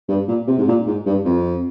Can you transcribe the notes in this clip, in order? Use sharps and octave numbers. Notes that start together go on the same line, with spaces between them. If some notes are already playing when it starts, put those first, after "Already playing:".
G2
A#2
C3
G#2
A#2
G#2
G2
F2